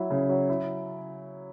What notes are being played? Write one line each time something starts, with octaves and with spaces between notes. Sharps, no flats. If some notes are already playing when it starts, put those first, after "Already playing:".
Already playing: F#3 E4
C#3
F#3
E4